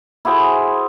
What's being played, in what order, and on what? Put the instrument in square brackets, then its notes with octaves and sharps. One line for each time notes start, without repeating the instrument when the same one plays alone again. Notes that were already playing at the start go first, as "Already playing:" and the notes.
[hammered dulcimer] E4 F#4 G#4 C5